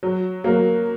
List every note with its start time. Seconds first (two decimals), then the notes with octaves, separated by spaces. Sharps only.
0.03 F#3
0.44 F#3 A#3